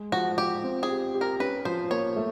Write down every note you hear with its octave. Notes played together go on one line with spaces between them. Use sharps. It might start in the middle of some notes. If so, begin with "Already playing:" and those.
Already playing: G#3 G#4
F3 F#4
F3 G4
C4
G#4
G4
G4
A#4
C#4 B4
F3 C5
A#3 C#5
A3